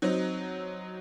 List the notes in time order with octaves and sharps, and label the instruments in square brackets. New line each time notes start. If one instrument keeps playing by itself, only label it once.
[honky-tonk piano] F#3 C4 D#4